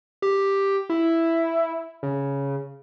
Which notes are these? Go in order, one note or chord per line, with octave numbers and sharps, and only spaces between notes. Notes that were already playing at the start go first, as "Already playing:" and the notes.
G4
E4
C#3